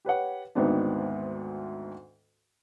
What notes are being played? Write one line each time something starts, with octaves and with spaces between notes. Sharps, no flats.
G4 B4 C#5 F#5
D2 G#2 D#3 B3 C4 D4